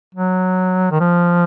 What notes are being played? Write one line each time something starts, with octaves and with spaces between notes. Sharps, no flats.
F#3
D#3
F3